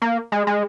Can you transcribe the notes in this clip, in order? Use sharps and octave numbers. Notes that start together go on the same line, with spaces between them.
A#3
G#3
G#3